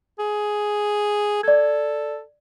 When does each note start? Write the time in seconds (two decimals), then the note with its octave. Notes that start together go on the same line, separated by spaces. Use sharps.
0.19 G#4
1.43 A4 D5 G#6